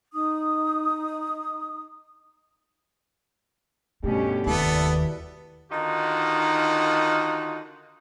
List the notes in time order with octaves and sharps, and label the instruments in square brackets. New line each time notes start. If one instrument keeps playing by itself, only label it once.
[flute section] D#4 D#6
[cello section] G2 B2 C#4 [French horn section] D3 G4 [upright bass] A3
[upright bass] F1 D#2 [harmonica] B3 A4 [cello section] E4 D5
[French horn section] B2 G3 B4
[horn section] D3 D#3 D#4 F4 F#4